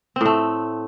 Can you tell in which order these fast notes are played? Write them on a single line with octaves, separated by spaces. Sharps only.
C4 A2 A3